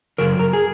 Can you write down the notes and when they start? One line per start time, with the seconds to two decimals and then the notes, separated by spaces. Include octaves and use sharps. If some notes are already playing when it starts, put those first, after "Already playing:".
0.18 F#2 C#3 F#3 A#4
0.39 A#4
0.53 G#4